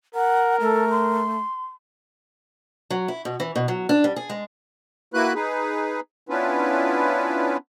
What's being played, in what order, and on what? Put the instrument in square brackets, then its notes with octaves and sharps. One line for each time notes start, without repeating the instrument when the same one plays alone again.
[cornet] A#4 [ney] F#5
[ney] A3 [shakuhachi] A4
[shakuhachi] C6
[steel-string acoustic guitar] F#3
E4
B2
E3
B2
F#3
D4
G3
G#4
G#3
[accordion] A#3 E4 F#4 B4 B5 F#6
D#4 G#4 B4
B3 C#4 D4 E4 F4 B4